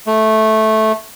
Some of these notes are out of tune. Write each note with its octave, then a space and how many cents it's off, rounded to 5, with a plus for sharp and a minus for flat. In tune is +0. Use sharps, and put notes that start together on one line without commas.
A3 -10